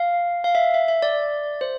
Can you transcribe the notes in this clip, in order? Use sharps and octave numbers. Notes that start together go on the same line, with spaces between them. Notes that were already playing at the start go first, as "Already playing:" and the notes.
Already playing: F5
F5
E5
E5
E5
D5
C5